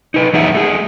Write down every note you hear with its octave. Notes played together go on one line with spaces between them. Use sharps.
D#4 B4 D#5
E3 F#3 D#4 G#4 E5 F#5
A3 G#4